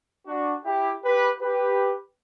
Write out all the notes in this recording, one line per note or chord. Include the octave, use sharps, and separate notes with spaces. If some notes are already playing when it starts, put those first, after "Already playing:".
D4 F#4
E4 G4
G4 B4
G4 B4